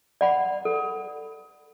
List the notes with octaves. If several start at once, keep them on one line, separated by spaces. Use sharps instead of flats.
D5 F#5 B5
A4